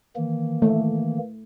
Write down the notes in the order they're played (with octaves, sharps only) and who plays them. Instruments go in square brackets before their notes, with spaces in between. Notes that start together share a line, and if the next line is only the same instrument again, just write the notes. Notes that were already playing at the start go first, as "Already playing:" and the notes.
[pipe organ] D#3 E3 A#3
[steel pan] A3